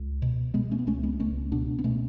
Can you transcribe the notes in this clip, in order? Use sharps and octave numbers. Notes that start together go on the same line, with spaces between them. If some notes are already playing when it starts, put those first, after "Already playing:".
Already playing: C#2
B2
B2 G#3 B3
A3 C#4
B3
C#2 A3 C#4
G#3 B3
C#2 A3 C#4
B2 B3 D4
B3
B2 A3 C#4